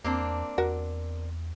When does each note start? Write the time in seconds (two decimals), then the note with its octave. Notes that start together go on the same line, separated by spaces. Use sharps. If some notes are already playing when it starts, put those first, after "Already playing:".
0.04 E2 A#3 C4 D4
0.58 E2 F#4 A#4